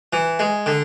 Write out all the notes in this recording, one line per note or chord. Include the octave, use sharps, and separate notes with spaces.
E3
G#3
D3